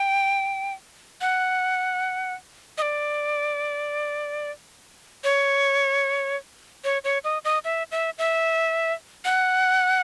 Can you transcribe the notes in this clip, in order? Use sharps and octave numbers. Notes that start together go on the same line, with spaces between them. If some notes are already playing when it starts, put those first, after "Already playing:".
Already playing: G5
F#5
D#5
D5
C#5
C#5
C#5
D#5
D#5
E5
E5
E5
F#5